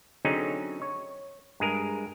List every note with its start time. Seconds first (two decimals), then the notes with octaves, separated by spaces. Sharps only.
0.25 D3 F#3 C4 C#4 D#4 G#4
0.82 C#5
1.60 G2 G#3 G#4 A#4